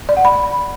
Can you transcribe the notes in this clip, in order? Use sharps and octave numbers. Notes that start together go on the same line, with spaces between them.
D5
F#5
B5